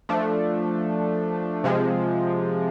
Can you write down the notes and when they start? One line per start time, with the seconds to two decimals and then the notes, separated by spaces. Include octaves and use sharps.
0.09 F3 A3 D4
1.64 C3 F3 G#3